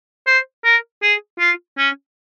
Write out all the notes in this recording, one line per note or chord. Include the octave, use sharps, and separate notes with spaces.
C5
A#4
G#4
F4
C#4